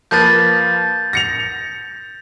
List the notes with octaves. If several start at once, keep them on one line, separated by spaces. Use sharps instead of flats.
F3 A#3 B4 G6 A6
A#6 C#7 F7